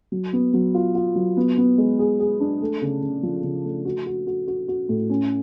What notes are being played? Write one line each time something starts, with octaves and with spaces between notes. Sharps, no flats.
F#3
B3
F#3
F4
F4
F#3
B3
B3
G#3
G#4
G#4
D4
A3
C#3
C#3
F3
C#3
A3
F#4
F#4
F#4
F#4
F#4
A2
C#4